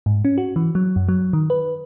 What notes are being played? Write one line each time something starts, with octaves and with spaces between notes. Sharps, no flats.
G#2
C#4
F#4
E3
F#3
F#2
F#3
D#3
B4